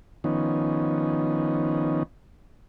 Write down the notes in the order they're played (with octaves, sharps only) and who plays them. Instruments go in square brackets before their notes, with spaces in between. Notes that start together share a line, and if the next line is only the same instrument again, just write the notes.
[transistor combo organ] D#3 F3 B3 C#4 D#4